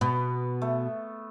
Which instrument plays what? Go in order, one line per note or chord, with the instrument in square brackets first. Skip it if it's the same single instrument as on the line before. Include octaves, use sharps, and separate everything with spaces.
[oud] B2 [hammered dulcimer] B3
[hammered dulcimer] A3